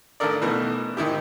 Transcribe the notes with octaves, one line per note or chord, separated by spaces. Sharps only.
A1 D#3 D4 A4 A#4 D5
B2 D#3 E3 A3 B3
G#2 D#3 E4 G4